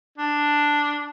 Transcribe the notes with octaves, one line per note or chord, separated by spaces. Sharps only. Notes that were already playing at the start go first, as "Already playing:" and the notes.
D4